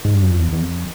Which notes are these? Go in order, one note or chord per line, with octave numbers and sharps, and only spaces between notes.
G#2
G2
F#2
F2
E2
E2
F2